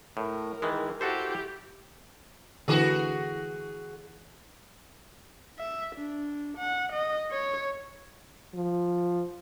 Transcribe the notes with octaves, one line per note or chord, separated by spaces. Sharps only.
A2 A#4
D#3 E3 G#3
E4 F#4 G4 A4 C5
D3 E3 F#4 G#4
E5
D4
F#5
D#5
C#5
F3